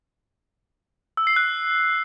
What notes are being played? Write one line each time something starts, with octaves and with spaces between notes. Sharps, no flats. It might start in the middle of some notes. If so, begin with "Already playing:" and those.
E6
C7
F#6